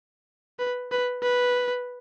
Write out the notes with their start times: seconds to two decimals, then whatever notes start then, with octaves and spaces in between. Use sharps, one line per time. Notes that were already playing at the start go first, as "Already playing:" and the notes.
0.59 B4
0.92 B4
1.22 B4